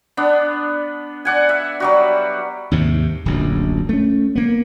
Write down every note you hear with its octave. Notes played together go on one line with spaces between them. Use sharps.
B3 D4
D5 F#5 G#5
E5
F#3 G3 F#4
D#2 G#2 C3
D1 A#1 F#2
A3 C#4
A#3 B3